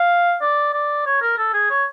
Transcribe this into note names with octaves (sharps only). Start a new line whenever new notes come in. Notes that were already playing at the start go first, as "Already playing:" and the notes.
Already playing: F5
D5
D5
C#5
A#4
A4
G#4
C#5